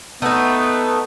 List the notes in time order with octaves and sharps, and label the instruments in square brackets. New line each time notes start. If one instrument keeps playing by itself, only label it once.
[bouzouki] A3 D#4 [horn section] B3